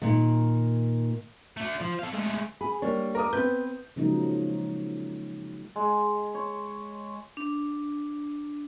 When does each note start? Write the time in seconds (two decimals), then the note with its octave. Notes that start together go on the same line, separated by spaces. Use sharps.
0.02 A#2 D#3
1.57 A3 D4
1.81 F3
1.99 A4 F5
2.13 G#3 A3
2.61 G#4 B5
2.82 G3 A#3 D4 C#5
3.15 A#4 D6 D#6
3.33 B3 C4 B4 G6
3.96 C#3 F3 F#3 G#3 A#3 D#4
5.76 G#3
6.35 C#5
7.37 D4